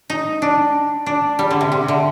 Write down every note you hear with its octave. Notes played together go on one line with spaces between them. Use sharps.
D#4
D4
D4
G3
D3
C3
C3
D3